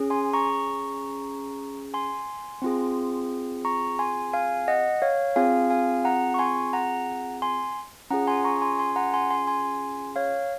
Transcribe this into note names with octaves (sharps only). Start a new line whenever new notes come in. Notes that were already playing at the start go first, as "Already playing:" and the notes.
Already playing: C#4 G#4
G#5 C6
A#5 C#6
G#5 C6
C4 F4 G#4
A#5 C#6
G#5 C6
F5 G#5
D#5 F#5
C#5 F5
C4 F4 G#4 F5 G#5
F5 G#5
F#5 A#5
C#6
G#5 C6
F#5 A#5
G#5 C6
C#4 F4 G#4 F#5 A#5
G#5 C6
A#5 C#6
G#5 C6
G#5 C6
F#5 A#5
G#5 C6
G#5 C6
G#5 C6
C#5 F5